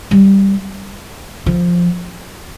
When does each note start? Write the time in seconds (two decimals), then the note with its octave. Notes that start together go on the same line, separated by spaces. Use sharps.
0.11 G3
1.46 F3